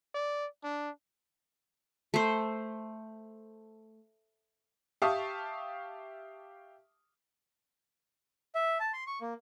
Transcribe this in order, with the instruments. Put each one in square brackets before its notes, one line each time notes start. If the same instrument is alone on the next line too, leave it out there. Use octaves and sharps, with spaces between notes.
[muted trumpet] D5
D4
[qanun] A3 C5
[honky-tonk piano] G4 E5 F5 A5 C#6 D#6
[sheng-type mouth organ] E5
A5
C6
C#6
A#3